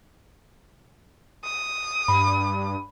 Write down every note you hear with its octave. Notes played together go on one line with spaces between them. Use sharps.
D#6
G2 B5